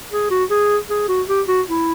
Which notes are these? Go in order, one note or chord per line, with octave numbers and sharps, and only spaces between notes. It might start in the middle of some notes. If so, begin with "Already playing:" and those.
G#4
F#4
G#4
G#4
F#4
G4
F#4
E4